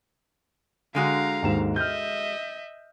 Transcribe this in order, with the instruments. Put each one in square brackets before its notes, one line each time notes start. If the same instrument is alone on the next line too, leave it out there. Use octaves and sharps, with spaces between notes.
[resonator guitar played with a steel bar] D3 G#3 F#4 [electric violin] F5 A#5
[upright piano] D#2 G#2 E7
[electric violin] D#5 E5 [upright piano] F6 G6